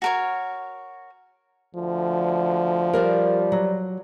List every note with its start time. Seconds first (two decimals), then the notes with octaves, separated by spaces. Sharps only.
0.02 F#4 A#4 C#5
1.75 D2 F3
2.93 G3 A#4 C5 D5
3.52 F#3